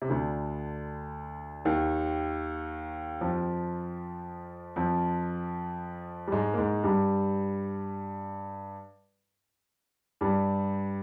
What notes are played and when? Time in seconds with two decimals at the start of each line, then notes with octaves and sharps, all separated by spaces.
0.02 C3
0.09 D2 D3
1.65 D#2 D#3
3.21 F2 F3
4.76 F2 F3
6.28 G3
6.32 G#2 G#3
6.54 A#3
6.58 G#2 G#3
6.84 G2 G3
10.21 G2 G3